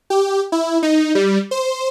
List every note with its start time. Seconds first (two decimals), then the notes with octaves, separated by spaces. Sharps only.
0.10 G4
0.52 E4
0.83 D#4
1.15 G3
1.51 C5